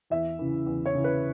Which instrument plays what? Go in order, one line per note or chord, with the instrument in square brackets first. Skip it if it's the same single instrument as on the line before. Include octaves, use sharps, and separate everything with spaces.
[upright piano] E2 E5
C#3 E3
E2
C#5
C#3 E3
B4